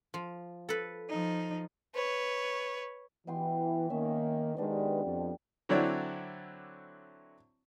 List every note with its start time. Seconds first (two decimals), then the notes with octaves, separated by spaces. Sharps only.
0.14 F3
0.69 A4 B4
1.10 F3 D#4
1.95 B4 C#5
3.27 B2 E3 G5 C6
3.90 D#3 A#3 C#4 E5
4.57 B2 D#3 G#3 D4 G4 B4
5.04 F2
5.69 D3 F#3 C4 E4 C#5 D5